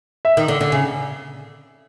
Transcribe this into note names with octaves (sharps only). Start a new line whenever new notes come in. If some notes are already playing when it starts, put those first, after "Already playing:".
E5
D#3
D3
D3
C#3